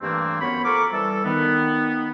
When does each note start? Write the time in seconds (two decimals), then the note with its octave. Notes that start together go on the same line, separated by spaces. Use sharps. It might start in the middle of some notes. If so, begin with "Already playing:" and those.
0.02 G2 E3 A3 A#3 C4
0.41 F#2 B3 C#5 B5
0.65 F3 A4 A#4 C#6 D6
0.92 E3 G3 A4
1.25 D#3 B3